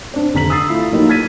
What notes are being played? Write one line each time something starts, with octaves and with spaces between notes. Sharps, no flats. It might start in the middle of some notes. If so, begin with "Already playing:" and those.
C4 D4
F1 D3 A#5 B6 F#7
D#6 E6 A6 C7
A3 E4 F4
F3 F#3 A#3 D#4 G4 A#4
F6 G#6 A6 B6 D#7